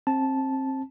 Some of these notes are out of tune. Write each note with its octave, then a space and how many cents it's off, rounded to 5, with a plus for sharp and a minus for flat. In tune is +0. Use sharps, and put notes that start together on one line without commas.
C4 +30 A5 -10